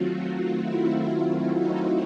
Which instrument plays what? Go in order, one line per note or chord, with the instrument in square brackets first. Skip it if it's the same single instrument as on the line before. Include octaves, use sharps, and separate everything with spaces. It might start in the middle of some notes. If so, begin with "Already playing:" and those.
Already playing: [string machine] D#3 F#3 A3 C4 F4 F#4
F#4
E4
E4
E4
D#4